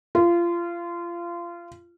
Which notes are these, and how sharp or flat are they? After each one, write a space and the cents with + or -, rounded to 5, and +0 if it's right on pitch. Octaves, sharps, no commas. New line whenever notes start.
F4 -25